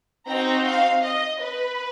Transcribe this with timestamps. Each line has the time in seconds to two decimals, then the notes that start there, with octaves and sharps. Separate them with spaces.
0.27 C4 D#4 F#4 A#5
0.65 F5
1.03 D#5
1.40 B4